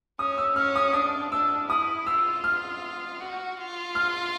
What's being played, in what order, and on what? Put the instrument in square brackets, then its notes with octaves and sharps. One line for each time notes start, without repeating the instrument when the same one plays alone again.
[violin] C#4 [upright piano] D#6
[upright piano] E6
[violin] C#4 [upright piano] F6
[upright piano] D#6
[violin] D4 [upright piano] D#6
[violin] D4 [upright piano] E6
[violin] E4 [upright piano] D#6
[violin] F4 [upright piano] E6
[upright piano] F6
[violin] F#4
F4
[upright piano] F6